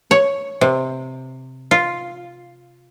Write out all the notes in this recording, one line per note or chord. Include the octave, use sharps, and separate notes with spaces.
C#5
C3
F4